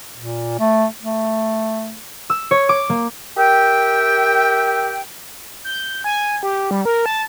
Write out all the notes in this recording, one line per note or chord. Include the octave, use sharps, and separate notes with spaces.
A#2
A3
A3
E6
C#5
D6
A#3
G4 A#4 E5 G5
G6
G#5
G4
G3
A#4
A5